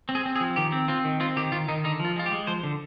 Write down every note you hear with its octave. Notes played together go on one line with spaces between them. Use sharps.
C4
G#4
C4
G#4
F3
D#3 G4
C4
C4 F4
D#3
C4 F4
D#3 G4
D#3 F4
D#3 D#4
D3 D#4
F3
F4
G#3 F4
G4
G#3
F3 C5
D3